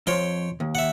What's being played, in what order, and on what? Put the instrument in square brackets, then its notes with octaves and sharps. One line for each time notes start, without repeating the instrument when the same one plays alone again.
[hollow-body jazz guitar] F2 [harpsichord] C#5 G5 C6
[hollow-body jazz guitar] D#2
[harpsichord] E5 F#5